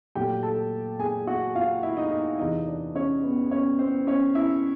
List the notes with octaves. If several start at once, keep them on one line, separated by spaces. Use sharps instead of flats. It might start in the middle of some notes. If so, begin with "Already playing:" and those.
A#2 F#3 A3 G4 G5
A4 A5
G#4 G#5
F#4 F#5
F4 F5
E4 E5
D#4 D#5
D#4 D#5
E2 C3 E3 D#4 D#5
D4 D5
C#4 C#5
B3 B4
C#4 C#5
C4 C5
C#4 C#5
E4 E5